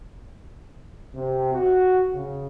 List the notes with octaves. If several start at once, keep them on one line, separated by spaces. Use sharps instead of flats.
C3
F#4
C#3